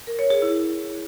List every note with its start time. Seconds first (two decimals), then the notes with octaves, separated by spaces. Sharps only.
0.07 A#4
0.19 C#5
0.30 G#4
0.42 E4